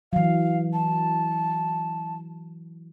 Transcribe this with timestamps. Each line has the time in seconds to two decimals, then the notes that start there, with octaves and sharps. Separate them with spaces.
0.13 E3 F#3 F5
0.73 A5